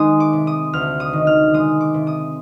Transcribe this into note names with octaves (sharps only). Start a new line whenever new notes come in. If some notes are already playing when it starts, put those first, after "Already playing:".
Already playing: D#3 G#3 D#6
D6
C3
D#6
D2 F6
D#6
D#3
F6
G#3 D#6
D6
C3
D#6